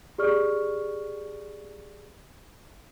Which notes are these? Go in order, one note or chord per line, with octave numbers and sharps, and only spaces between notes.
G4 G#4 D5 C#6 F6